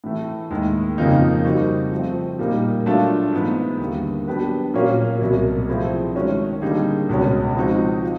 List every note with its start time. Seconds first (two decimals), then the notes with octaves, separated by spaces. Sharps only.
0.04 A2 E3 A3
0.51 D#2 D#3 G#3
0.98 F2 C#3 F3 A#3 D#4
1.45 G3 C4 D#4 F#4
1.92 F3 A3 C4
2.39 A#2 G3 A#3 D#4
2.86 F#3 A3 D4 F4
3.32 G#2 E3 G#3 B3
3.80 D#2 D3 G3 A#3
4.28 F#3 B3 D4 G4 B4
4.74 A#2 F#3 A#3 C#4
5.21 C2 B2 F#3
5.68 F3 A3 C4 E4 G#4
6.15 D#3 G#3 C#4 F#4
6.62 D3 G3 A#3 D#4 G#4
7.09 C#2 B2 G#3 C#4
7.57 F3 G#3 C4 D#4 F#4
8.03 F4